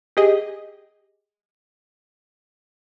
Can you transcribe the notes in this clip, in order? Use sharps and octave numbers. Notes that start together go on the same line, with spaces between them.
G4 G#4 D#5